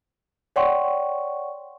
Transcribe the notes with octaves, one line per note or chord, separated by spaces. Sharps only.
C#5 D5 F#5 G5 C6 C#6